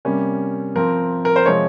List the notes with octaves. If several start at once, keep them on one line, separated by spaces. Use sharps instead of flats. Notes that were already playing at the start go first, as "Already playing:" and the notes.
C3 G3 A#3 C#4
F3 C4 A#4
A#4
C5
C3 F3 G#3 C4 C#5